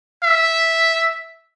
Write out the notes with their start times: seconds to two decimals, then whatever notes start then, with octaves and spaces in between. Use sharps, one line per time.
0.24 E5